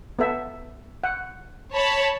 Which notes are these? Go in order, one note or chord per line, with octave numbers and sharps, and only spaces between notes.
B3 A4 E5
F#5
C#5 A5 B5